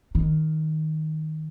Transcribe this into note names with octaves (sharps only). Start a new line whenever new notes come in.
D#3